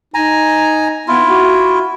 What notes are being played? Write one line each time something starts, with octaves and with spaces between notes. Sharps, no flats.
D#4 G#5 A#5
B3 E4 F4
F#4